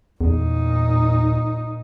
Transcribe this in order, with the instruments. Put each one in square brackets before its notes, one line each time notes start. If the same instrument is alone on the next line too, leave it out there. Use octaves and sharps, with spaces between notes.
[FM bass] E2 [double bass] A#2 D#4